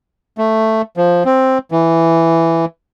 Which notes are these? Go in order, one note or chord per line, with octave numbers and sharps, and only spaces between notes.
A3
F3
C4
E3